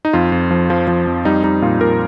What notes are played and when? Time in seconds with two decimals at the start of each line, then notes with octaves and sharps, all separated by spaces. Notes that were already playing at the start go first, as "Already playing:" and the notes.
0.05 D#4
0.13 F2 F4
0.32 F2
0.51 F3
0.70 F3
0.88 F3
1.07 F2
1.25 G3 D#4
1.44 G3 D#4
1.62 A#2 F4
1.81 A#2 A#4